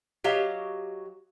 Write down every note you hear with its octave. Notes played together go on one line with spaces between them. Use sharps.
F#3 G4 D#5 F5